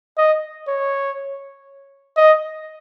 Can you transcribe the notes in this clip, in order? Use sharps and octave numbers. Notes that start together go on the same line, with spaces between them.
D#5
C#5
D#5